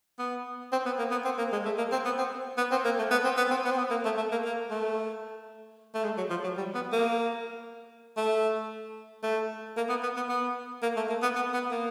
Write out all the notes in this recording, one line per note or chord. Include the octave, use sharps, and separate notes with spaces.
B3
C4
B3
A#3
B3
C4
A#3
G#3
A3
A#3
C4
B3
C4
B3
C4
A#3
A3
B3
C4
B3
C4
B3
C4
B3
A#3
A3
A3
A#3
A#3
A3
A3
G#3
F#3
F3
F#3
G3
B3
A#3
A3
A3
A#3
B3
B3
B3
B3
A#3
A3
A#3
B3
B3
B3
A#3